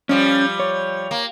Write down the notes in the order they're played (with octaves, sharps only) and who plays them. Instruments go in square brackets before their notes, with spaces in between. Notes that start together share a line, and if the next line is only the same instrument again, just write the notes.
[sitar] F3 G3 [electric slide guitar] C#4
[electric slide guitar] C#5
[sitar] A#3